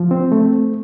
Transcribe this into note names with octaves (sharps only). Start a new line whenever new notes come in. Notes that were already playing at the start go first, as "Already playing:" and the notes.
Already playing: F3
C4
A3